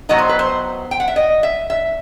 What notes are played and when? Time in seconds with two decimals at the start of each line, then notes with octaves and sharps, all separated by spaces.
0.09 A2 F#3 B3 D#4 D#5
0.18 C5
0.29 B4
0.39 C5
0.91 G5
1.00 F#5
1.08 E5
1.16 D#5
1.43 E5
1.70 E5